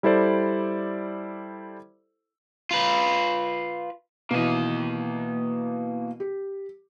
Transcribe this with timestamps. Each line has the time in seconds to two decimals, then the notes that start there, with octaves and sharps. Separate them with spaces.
0.03 G3 E4 A4 C5 D5
2.71 F4 B4
4.31 B2 E3 A#3 D#5
6.20 G4